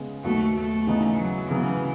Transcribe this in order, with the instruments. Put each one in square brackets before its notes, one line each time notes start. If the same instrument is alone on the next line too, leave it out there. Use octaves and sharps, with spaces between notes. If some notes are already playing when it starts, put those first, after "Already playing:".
Already playing: [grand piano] C#3 G#3 B3
[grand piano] D#2 D#3 F#3 B3 F#4 [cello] A3
[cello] A3
[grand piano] C#3 E3 B3 D#4
[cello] F#3
[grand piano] C#3 F#3 B3 [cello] E3